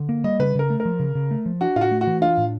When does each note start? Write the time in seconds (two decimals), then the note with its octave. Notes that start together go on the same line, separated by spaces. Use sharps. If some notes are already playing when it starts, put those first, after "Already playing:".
Already playing: D3
0.09 A#3
0.24 G3 D#5
0.39 C#3 B4
0.55 C#3 A#4
0.70 A3
0.80 A#4
0.85 F3
1.00 C#3
1.15 C#3
1.31 A3
1.46 F3
1.61 D4 F#4
1.76 A2 F4
1.81 F#4
1.91 A3
2.01 F#4
2.07 E3
2.21 D4 F4
2.37 A2